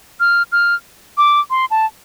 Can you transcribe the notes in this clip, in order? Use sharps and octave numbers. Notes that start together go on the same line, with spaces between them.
F6
F6
D6
C6
A5